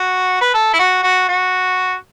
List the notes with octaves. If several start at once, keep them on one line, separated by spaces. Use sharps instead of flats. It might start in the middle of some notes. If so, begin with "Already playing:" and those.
Already playing: F#4
B4
A4
E4
F#4
F#4
F#4